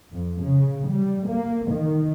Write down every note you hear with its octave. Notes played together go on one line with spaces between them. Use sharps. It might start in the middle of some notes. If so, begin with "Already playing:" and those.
F2
C#3
G3
A#3
D#3